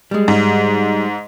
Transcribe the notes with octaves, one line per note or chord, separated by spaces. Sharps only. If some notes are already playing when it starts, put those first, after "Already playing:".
G3 G#3
G#2